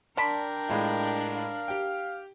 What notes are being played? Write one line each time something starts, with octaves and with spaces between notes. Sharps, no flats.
D4 A#4 D5 G5 A5 B5 C6
A2 G#3 F4
F5
G4 G5